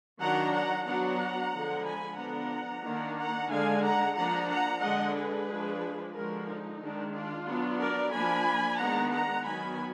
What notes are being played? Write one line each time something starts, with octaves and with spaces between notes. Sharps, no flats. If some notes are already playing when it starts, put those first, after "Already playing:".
D#3 F#3 D4 F#5 A#5
F#5 A#5
F#3 B3 D4 F#5 A#5
D3 F3 G#3
G#5 B5
D3 F3 B3 D4 F#5 A#5
D#3 A#3 D4
F#5 A#5
D3 G#3 D4 F5 G#5
F#5 A#5
F3 A#3 D4 F#5 A#5
F#5 A#5
D3 G#3 D4 D#5 F#5
G#4 B4
F3 G#3 D4
D3 F3 G#3 F#4 A#4
D#4
D#3 G#3 D4
D4 F4
F#3 B3 D4
A#4 D5
F3 A#3 D4 G#5 B5
D#3 G#3 B3 D4 F#5 A#5
F#5 A#5
D#3 F#3 B3 G#5 B5